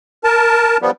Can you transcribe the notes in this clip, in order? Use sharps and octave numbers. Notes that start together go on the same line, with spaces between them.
A#4 A5
F3 G3 B3